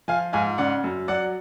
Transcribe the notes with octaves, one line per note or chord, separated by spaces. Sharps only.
F3 F5 G#5
G#2 F5 G#5
C#3 D5 F#5
F#2
F#3 D5 F#5